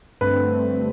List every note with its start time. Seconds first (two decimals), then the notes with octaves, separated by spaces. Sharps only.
0.21 G2 D3 A3 C4 B4